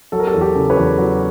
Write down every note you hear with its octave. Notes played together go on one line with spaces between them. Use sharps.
F#3 A4
A#4
G4 A4
E2
G4 A4
C#3
B4 C#5
E2
F#3